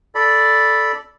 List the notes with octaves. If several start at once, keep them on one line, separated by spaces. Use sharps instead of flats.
A4 D5 B5